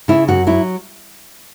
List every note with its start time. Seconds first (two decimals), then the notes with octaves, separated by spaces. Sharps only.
0.08 C#3 E4
0.28 F#2 F#4
0.47 F#3 E4